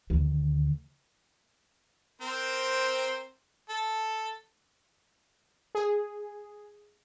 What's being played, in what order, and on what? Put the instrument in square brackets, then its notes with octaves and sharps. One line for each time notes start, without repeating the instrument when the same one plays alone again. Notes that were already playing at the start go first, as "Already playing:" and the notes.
[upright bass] D2 D#3
[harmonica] C4 A#4 C5
A4
[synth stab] G#4